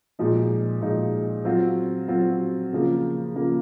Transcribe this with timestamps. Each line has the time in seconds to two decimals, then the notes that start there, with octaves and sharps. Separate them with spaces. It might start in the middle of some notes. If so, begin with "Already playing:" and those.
0.19 A#2 F3 G#3 D#4
0.81 A#2 F3 G#3 D#4
1.45 F#3 C4 F4
2.08 F#3 C4 F4
2.72 C#3 F3 A#3
3.35 C#3 F3 A#3